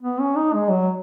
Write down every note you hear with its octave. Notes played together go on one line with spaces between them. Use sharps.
B3
C#4
D#4
G#3
F#3